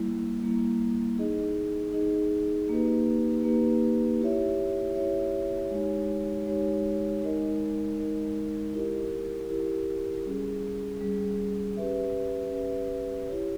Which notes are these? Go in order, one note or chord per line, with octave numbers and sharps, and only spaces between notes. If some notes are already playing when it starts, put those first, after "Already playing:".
Already playing: G3 A#3 E4
G3 A#3 E4
D#4 G#4 D#5
D#4 G#4 D#5
A#3 D#4 G4 B4
A#3 D#4 G4 B4
E4 G4 C#5 E5
E4 G4 C#5 E5
G#3 D#4 G4 C#5
G#3 D#4 G4 C#5
G#3 D#4 A#4 D#5
G#3 D#4 A#4 D#5
E4 G4 A#4
E4 G4 A#4
G3 C#4 G#4
G3 C#4 G#4
C#4 G4 B4 E5
C#4 G4 B4 E5
E4 G4 C#5